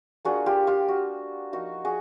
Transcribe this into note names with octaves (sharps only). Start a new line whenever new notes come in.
A#3 D4 F4 F#4 G#4
F4 G4
F4 G4
F#4
F3 A#3 D#4 F#4
F#4 G#4